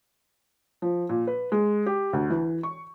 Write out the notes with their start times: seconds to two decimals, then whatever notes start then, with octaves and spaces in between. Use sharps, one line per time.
0.82 F3
1.09 A#2
1.27 B4
1.52 G#3
1.86 G4
2.13 D2
2.30 E3
2.63 C#6